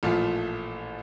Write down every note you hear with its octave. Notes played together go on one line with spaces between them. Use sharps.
A1 A#2 F3 A3